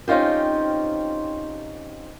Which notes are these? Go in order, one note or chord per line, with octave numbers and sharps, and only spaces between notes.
C4 C#4 D#4 F4 G4